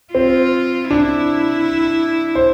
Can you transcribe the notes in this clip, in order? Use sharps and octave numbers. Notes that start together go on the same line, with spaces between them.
C4 F4
D4 E4
C5